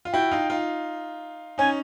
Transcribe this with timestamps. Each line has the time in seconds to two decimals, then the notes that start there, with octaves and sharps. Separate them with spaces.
0.05 F4
0.12 E4 F#4 G5
0.31 D#4 F4
0.50 D#4 F4
1.58 C#4 D#4 G#5